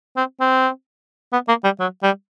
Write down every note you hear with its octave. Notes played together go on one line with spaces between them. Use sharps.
C4
C4
B3
A#3
G3
F#3
G3